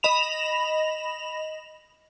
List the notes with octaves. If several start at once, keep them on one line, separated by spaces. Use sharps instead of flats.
D#5 B5 E7 F7